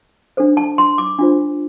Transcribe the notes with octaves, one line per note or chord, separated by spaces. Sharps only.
D4 A4 C5
A5
C6
D6
D4 F4 C5